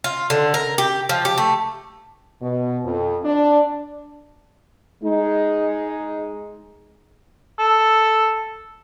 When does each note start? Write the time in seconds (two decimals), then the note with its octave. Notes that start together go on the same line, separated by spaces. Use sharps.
0.04 F4
0.30 D3
0.54 A#4
0.78 G4
1.09 F3
1.25 G4
1.38 A3
2.42 B2
2.84 F2
3.24 D4
5.04 G#3 D#4
7.59 A4 E6